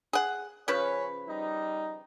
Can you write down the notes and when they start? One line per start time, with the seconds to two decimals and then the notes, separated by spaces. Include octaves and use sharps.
0.13 G#4 F#5
0.68 C#3 F3 C#4 B4 C#5
1.28 G3 D#4